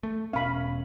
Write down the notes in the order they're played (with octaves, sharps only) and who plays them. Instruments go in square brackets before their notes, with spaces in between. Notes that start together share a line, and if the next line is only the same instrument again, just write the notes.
[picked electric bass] A3
[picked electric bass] E1 B2 C#4 [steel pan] F5 B5